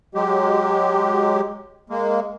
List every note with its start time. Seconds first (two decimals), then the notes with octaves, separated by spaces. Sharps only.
0.15 F#3 G#3 G4
1.90 G#3 A#3